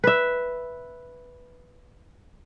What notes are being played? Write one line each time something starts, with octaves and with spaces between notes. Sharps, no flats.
B4 E5